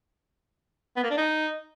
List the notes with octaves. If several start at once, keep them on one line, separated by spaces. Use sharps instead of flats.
B3
A#3
D4
D#4